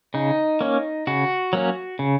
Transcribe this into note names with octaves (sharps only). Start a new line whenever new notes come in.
C#3 D#4
A#3 C#4
C#3 F#4
F#3 A#3 C#4
C#3